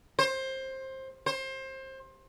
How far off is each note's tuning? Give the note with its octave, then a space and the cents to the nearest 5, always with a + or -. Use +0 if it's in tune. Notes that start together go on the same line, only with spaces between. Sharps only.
C5 +20
C5 +25